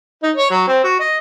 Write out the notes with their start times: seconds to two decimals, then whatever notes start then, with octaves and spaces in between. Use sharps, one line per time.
0.23 D#4
0.36 C#5
0.51 F#3
0.68 C4
0.84 F#4
1.00 D#5